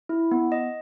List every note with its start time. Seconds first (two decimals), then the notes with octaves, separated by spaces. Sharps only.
0.09 E4
0.31 B3
0.52 D#5